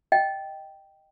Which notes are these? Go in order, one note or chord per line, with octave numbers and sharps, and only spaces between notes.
D#5 G5